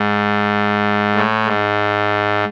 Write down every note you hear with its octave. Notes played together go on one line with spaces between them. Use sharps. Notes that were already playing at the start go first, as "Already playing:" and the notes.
Already playing: G#2
A2
G#2